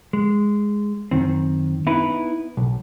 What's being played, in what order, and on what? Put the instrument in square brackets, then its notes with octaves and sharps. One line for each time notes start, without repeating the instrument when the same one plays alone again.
[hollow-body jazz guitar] G#3
F#2 D#3 C4
B3 D#4 E4 B4
B1